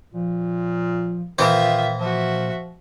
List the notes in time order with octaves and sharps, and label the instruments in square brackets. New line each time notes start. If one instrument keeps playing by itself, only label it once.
[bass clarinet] A#2 [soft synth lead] F3
[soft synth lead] A#2 [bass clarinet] D#3 [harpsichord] E3 C4 [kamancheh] F4 E5
[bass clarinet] F3 [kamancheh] F#4 E5